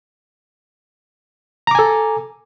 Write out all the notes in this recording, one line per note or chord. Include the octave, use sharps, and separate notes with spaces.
A4 G#5 A#5 D6